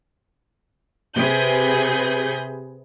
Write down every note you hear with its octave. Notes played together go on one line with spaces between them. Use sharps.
C3 G#4 B4 G6